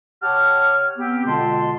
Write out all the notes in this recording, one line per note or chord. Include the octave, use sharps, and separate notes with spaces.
C3 G4 C#5 F#5 A5 F6
B3 C4 G4
B2 D3 G#3 F4 A5 C6